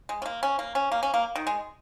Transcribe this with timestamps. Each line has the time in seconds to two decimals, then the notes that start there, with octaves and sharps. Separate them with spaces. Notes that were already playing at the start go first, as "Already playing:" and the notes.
0.09 G#3
0.22 C#4
0.26 A#3
0.43 C#4
0.59 A#3
0.75 C#4
0.92 A#3
1.03 C#4
1.14 A#3
1.36 D#3
1.47 G#3